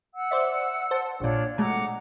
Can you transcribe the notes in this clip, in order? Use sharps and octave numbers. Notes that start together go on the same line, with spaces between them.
F#5 E6
C5 D5 E5
C5 A5
A#1 A#2 D4 F4 C#5
B2 G#3 A3 F#5 A#5 D6